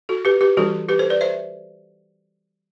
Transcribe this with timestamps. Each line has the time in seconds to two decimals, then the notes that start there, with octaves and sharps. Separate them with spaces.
0.09 F#4 A4
0.25 G4 B4
0.41 G4 B4
0.57 E3 G3 D4 F#4 A4
0.89 G4 B4
0.99 A4 C5
1.10 B4 D5
1.21 C5 E5